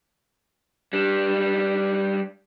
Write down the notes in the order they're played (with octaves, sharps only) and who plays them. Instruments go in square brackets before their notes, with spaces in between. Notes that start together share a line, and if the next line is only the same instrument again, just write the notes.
[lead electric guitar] G3 D4